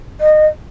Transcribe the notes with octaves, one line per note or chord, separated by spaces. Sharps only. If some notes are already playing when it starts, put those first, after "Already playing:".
D#5